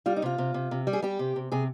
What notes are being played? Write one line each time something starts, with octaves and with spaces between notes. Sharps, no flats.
G3 F4
D#4
C3 F4
C3
C3
C3
G3
G#4
G3 G4
C3
C3
C3 G#4